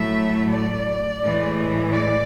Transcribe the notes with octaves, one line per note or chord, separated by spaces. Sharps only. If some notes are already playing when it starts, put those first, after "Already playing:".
Already playing: A2 F#3 A3 E5
D5
A2 E3 G#3
D5